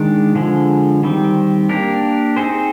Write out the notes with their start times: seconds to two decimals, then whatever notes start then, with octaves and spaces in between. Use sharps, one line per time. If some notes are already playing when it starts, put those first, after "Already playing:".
Already playing: D#3 G#3 D4
0.35 D3 F3 G#3
1.03 D#3 G3 C4
1.69 A#3 D4 G4 A#4
2.37 C4 D#4 G#4 C5